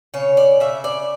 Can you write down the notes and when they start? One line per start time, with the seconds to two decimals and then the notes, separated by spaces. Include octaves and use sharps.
0.14 C#3 C#5
0.37 D5
0.60 C#3 E5
0.84 D5